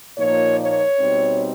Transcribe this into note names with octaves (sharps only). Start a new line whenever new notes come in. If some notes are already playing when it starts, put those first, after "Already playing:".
A#2 F3 A#3 D#4 C#5
C#5
B2 G3 C4 D#4